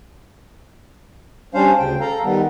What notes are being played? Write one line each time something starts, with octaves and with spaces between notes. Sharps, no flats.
G3 C#4 D4 C5 F5
D2 C#3 G5
A4 F5 A#5
D#3 G3 B3